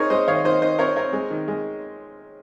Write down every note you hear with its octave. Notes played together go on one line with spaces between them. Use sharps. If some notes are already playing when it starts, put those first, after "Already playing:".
Already playing: C4 D#4 G#4 A#4 C#5
G#3 C5 D#5
D#3 C#5 F5
D#3 C5 D#5
D#3 C5 D#5
C4 A#4 C#5
C4 A#4 C#5
G#3
D#3
G#3